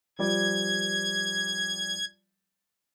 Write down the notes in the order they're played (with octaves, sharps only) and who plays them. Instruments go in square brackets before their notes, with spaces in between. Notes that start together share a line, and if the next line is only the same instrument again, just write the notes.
[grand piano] F3 G3 D5 [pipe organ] G#6